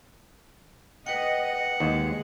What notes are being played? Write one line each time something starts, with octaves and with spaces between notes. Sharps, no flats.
B4 D#5 F#5 G5
D#2 G#3